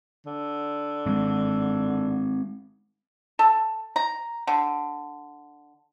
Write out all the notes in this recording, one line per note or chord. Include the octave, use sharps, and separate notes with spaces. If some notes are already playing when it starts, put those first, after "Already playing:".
D3
G#3 C4
A4
A#5
D3